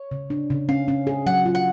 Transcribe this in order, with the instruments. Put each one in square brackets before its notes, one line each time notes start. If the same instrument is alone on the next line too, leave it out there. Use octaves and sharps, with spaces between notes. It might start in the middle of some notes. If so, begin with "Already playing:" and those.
Already playing: [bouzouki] C#5
[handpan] C#3
D4
C#3
[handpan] C#4 [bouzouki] F5
[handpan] C#4
G#4
[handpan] F#3 [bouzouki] F#5
[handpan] F4
[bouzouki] F#5